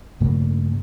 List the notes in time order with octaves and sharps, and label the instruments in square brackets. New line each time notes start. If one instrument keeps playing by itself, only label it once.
[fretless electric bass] G2 C#3 A3 A#3